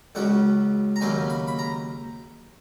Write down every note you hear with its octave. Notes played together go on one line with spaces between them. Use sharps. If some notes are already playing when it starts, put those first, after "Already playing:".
C#2 C#3 F#3 C#4 F#5
A#5
D#2 C#3 F#3 A#3 C#4 G#5
B5
B5
A#5